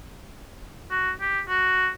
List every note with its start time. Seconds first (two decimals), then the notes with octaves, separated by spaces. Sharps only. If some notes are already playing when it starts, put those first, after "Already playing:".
0.91 F#4
1.21 G4
1.48 F#4